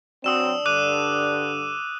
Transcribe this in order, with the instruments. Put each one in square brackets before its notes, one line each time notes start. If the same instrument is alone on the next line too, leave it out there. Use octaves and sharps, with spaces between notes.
[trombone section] F#3 C4 [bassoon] D4 [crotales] D#6 E6 E7
[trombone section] G2 D3 [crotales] D6 F#6 D#7